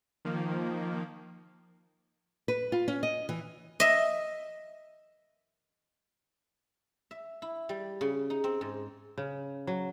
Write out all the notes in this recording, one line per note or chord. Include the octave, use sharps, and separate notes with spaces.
D#3 F3 A#3
B4
F4
C#4
D#5
E3
D#5 E5
E5
E4
G3
C#3
D#4
C4
G#2
C#3
F#3